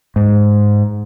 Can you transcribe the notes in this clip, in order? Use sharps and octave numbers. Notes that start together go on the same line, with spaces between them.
G#2